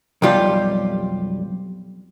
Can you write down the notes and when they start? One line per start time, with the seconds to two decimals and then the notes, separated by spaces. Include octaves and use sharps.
0.22 B1 F2 G3 F4 G4